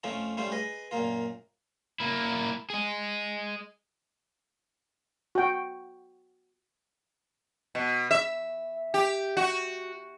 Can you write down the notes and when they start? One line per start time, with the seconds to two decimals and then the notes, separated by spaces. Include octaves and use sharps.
0.04 F2 F3 A3 C#4 F4
0.37 G3 A3 C#4 F4 C5
0.52 G#4 B4 D#5
0.91 F#2 A#2 A#3 F4
2.00 A#3 E4
2.70 G#4 D#5
5.35 F#4 G5
7.75 B2
8.11 E5
8.94 G4
9.37 F#4